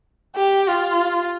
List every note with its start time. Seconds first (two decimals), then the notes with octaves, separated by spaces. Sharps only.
0.35 G4
0.67 F4